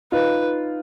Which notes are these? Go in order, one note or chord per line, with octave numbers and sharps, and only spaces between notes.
D#4 F4 B4